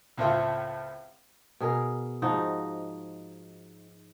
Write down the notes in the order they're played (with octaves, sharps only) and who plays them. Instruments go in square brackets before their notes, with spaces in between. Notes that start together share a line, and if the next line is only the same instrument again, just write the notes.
[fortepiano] C#2 A2 C4 F4
[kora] B2 G#4 A#4
G#2 F3 D#4 F#4